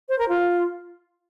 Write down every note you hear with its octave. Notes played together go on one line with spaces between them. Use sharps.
C5
A#4
F4